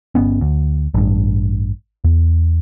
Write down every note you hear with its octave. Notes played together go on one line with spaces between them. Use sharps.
G1 B3 C#4
D2
A1 G2
E2